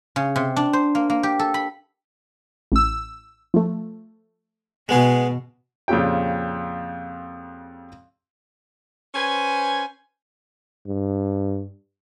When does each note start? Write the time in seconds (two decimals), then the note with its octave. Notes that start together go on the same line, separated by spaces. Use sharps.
0.16 C#3
0.36 C3
0.56 D4
0.73 C5
0.95 A#3
1.10 A#3
1.23 G4
1.39 A4
1.54 B5
2.72 A1 E6
3.54 F3 A3
4.89 B2 G#3 B3 G#4
5.88 F2 A#2 C#3 G4 G5
9.14 C#4 B4 C5 G#5
10.87 G2